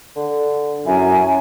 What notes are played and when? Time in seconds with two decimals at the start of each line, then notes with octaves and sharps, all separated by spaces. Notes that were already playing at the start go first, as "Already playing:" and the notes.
0.16 D3
0.86 F#2 E4 G#5